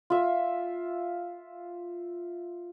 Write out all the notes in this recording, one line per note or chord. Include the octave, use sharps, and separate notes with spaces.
F4 E5